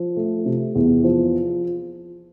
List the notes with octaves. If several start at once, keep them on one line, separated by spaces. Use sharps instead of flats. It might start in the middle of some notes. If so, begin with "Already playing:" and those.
Already playing: F3
A3
C3
E2
F3